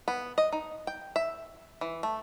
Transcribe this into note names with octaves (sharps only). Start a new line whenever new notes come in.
B3
D#5
D#4
G5
E5
E3
A3